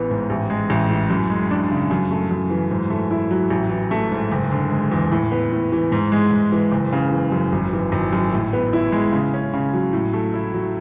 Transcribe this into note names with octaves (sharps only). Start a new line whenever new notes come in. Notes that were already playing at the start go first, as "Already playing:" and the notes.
Already playing: A1 E3 B3
G#2
A1
G#3
A1
A2
F#2
G#3
D4
C#3
F#2
A3
F#2
E3
G#2
A3
E4
F#3
A1
E3
A3
G#2
F#1
D3
G#3
E2
A2
B3
A2
E3
G#2
G#3
G#2
E3
F#1
C#3
E3
F#2
G#1
E3
G#1
F#2
A2
B3
E4
G#3
C#3
C#4
C#3
F#3
A2
A3
E4
F#3